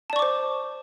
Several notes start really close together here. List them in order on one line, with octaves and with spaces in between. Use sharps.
A5 D5 C#6 D6 C5